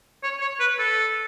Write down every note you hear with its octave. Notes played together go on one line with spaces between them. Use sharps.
C#5
C#5
B4
A4